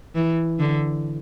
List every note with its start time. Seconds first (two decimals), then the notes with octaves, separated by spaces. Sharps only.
0.15 E3
0.59 D3